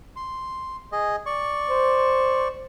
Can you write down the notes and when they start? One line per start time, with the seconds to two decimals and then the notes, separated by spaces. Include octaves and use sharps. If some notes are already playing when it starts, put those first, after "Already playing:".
0.16 C6
0.92 G#4 D#5
1.26 D5 C#6
1.69 C5